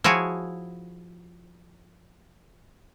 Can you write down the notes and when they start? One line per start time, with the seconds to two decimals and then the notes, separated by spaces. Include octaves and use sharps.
0.04 F3 E4 F#4 G#4 C#5